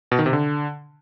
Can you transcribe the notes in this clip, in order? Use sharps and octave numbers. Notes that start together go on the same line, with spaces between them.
B2
D#3
C3
D3